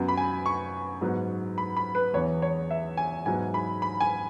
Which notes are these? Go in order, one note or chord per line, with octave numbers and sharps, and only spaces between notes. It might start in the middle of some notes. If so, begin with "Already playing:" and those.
Already playing: F#2 F#3 B3
B5
G#5
C#6
G#2 F#3 B3
B5
B5
B4
E2 E3 B3 C#5
C#5
E5
G#5
G#2 F#3 B3 G#5
B5
B5
G#5